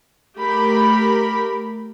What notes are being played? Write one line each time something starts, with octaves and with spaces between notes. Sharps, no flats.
A3 G4 A#4 B5